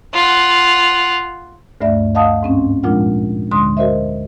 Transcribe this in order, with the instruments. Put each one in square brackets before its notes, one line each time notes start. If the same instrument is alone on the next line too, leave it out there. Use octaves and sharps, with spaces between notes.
[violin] F4 F#5
[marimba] D2 G2 A3 D5 E5
D#5 F5 F#5 A5 D#6
G#2 C4 C#4
A#2 F3 G#3 D4 F4 F#5
D2 D3 G#3 C6 D#6
F#4 A#4 C5 D#5 E5